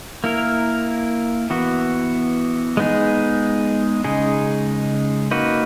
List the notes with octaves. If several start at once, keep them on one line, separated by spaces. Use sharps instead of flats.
A#3 E4 A#4
E3 B3 F#4
G#3 B3 D#4 G#4
C#3 G#3 D#4 G#4
A#3 D#4 F#4 B4